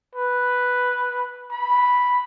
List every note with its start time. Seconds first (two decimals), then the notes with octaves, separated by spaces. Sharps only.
0.15 B4
1.52 B5